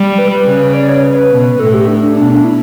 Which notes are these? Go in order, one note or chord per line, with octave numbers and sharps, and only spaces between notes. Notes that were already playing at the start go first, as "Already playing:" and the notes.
Already playing: G3
B4
C#3
D5
C#5
B4
B2
A2 A4
G4
D4
D4
B2 D4
D4
E4